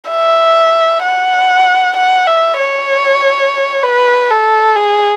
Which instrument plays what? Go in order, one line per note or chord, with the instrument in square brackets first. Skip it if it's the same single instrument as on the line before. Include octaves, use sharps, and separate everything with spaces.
[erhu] E5
F#5
F#5
E5
C#5
B4
A4
G#4